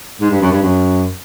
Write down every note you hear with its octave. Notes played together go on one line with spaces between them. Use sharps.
G#2
G2
F#2
G2
F#2